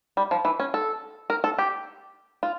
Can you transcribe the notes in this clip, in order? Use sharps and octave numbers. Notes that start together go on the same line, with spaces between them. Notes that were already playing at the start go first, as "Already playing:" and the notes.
G3
F3
E3
C#4
A4
A#4
A4
G4
F4